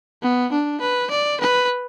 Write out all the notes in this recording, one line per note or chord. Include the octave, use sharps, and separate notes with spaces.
B3
D4
B4
D5
B4